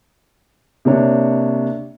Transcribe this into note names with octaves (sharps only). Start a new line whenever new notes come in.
C3 A#3 D4 C#5